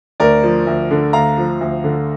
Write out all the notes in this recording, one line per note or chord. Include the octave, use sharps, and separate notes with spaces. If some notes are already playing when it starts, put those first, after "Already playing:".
D2 A#4 D5
F3
D2
D3
D2 F5 A#5
F3
D2
D3